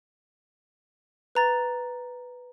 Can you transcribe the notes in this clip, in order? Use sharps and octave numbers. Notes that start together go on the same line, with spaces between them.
B4 A#5 A6